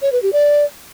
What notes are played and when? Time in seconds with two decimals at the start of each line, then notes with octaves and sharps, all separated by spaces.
0.02 C#5
0.12 B4
0.22 G4
0.33 D5